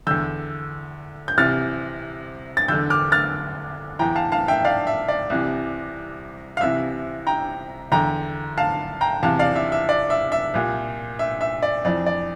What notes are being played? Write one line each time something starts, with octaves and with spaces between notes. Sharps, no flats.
E2 D3 E6 G6
G6
C2 C3 E3 F6 A6
A6
E2 D3 E6 G6
D6 F6
F6 A6
E2 E3 G5 A#5
F5 A5
F5 A5
E5 G5
D5 F5
E5
D5
C2 C3 E3
F5
C2 C3 E3 E5
G5 A#5
E2 D3 G5 A#5
F5 A5
G5 A#5
E2 C3 E3 F5 A5
D5 F5
E5
E5
D5
E5
E5
C2 A#2
E5
E5
D5
F2 E3 D5
D5